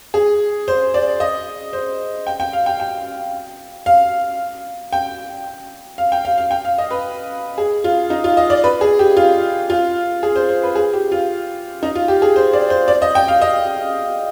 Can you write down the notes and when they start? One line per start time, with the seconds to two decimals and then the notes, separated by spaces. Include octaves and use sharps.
0.14 G#4
0.68 C5
0.94 D5
1.20 D#5
1.73 C5
2.27 G5
2.40 G5
2.53 F5
2.66 G5
2.80 G5
3.86 F5
4.93 G5
5.98 F5
6.12 G5
6.25 F5
6.38 F5
6.51 G5
6.65 F5
6.78 D#5
6.91 B4
7.58 G#4
7.84 F4
8.10 D#4
8.24 F4
8.37 D#5
8.50 D5
8.64 B4
8.81 G#4
8.99 G4
9.17 F4
9.70 F4
10.23 G#4
10.36 C5
10.49 C5
10.63 B4
10.75 G#4
10.93 G4
11.12 F4
11.83 D#4
11.95 F4
12.08 G4
12.22 G#4
12.36 C5
12.53 D5
12.70 C5
12.88 D5
13.02 D#5
13.15 G5
13.28 F5
13.41 D#5